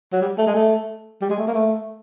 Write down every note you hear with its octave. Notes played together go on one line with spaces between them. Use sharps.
F#3
G3
A3
G#3
A3
G3
G#3
A3
A#3
A3